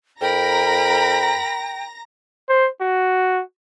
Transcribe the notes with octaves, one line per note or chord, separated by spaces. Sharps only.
F2 A#4 G5 A#5 B5 A#6
C5
F#4